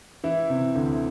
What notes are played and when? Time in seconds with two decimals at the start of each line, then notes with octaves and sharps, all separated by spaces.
0.24 E3 E4
0.50 C3
0.75 D2